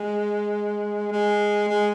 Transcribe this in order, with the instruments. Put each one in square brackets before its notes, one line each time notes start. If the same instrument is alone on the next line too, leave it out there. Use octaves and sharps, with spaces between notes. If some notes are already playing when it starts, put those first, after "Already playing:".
Already playing: [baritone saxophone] G#3
G#3
G#3